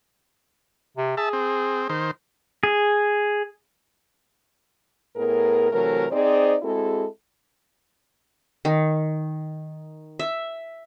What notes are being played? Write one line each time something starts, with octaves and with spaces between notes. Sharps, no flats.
C3
G#4 E5 A5
C4
D#3 C5
G#4
A2 B3 G#4 A#4
C3 E3 F#3 A3 A#4
C4 D#4 G#4 C5 D5
G#3 C4 E4 F#4 G#4 A4
D#3
E5